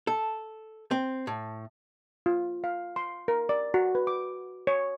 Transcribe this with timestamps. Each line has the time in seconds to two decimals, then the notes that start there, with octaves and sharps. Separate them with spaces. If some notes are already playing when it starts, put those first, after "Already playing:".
0.07 A4
0.91 C4
1.27 A2
2.26 F4
2.64 F5
2.96 C6
3.28 A#4
3.49 D5
3.74 F#4
3.95 B4
4.07 D6
4.67 C#5